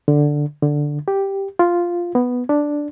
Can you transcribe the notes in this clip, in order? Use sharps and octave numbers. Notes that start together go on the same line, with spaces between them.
D3
D3
G4
F4
B3
D4